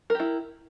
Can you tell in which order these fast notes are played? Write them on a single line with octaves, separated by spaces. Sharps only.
A#4 G4 E4